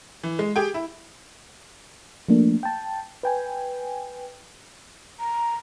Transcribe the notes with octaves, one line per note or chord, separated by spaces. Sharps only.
E3
G#3
G4 G#4 G5
E4
F3 A3 A#3 D4
G5 A5
B4 G5 G#5
A#5